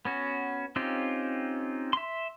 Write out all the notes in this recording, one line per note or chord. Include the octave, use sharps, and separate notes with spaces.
B3 C#4 F#4
C4 C#4 D#4 F4 G4
E5 C6